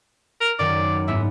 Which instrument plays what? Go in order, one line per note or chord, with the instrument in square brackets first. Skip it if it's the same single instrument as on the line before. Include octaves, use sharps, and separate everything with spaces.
[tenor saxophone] A#4
[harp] F#2 D#3 [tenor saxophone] D5
[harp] G#2 B3 [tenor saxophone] E4